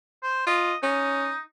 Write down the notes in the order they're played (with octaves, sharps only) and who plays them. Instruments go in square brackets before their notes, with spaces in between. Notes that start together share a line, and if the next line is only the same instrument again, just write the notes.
[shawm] C5
[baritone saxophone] F4 [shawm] D#5
[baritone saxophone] C#4 [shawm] D#4